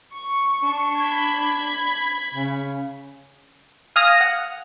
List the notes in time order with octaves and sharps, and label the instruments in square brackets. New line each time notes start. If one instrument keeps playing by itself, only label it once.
[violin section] C#6
[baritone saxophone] D4
[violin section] B5 G#6
[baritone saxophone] C#3
[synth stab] F5 G#5 D#6 F6 A#6
F#5